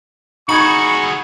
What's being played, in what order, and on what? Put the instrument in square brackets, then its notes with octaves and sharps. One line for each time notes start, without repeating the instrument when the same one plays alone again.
[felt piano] D#4 G#6 [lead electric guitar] F#4 G#4 [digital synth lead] B5 [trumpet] C#6